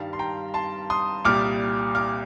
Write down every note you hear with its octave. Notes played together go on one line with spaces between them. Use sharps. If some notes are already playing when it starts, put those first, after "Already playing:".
Already playing: G2 D#3 G3 F5 A5
C6
G5 A#5
A5 C6
C6 D#6
C2 A#2 G3 D6 F6
D6 F6